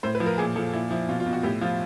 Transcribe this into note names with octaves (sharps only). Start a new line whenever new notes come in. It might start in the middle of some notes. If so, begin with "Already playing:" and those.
A2 C5
B4
F3
A#4
A#2 G#4
F3 A4
A#2 E4
F3 E4
B2 F4
F4
B2
F#4
A2 G4
F3 F4